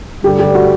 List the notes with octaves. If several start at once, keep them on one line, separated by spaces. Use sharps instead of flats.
G2 D3 G3 G4
G4
F#4